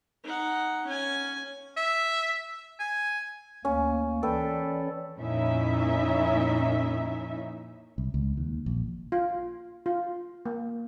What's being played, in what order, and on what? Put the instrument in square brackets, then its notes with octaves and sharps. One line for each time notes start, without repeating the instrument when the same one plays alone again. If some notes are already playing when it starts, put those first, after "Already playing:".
[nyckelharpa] D#4 F#5
C#4 G#5
[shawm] E5
G#5
[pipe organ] D2 A#3 [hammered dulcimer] C#4
[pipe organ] E3 C#4 D5 [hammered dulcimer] A4 B4 G5
[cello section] F2 A#2 C#4 D#4 E4 E5
[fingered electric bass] C2
C#2
D#2
A#1
[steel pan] F4
F4
A#3